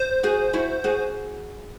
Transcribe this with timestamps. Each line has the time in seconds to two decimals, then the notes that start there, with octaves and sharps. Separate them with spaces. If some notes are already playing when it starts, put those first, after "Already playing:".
Already playing: C5
0.23 F#4 G#4
0.53 E4 F#4
0.84 F#4 G#4